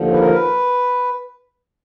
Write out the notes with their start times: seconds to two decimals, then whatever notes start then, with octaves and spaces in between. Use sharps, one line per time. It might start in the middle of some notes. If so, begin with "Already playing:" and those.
Already playing: D#2 D3 F3
0.12 B4
0.19 A#4
0.32 B4